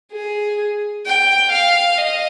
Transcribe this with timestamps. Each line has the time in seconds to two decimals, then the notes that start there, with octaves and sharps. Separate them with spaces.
0.12 G#4
1.06 G5
1.52 F5
1.98 D#5